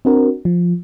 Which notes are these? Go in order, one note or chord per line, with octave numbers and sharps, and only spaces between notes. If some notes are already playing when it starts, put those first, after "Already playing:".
C4 D4 F#4 A#4
F3